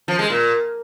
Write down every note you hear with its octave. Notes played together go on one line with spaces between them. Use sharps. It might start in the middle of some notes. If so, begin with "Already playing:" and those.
F3
G#3
A#2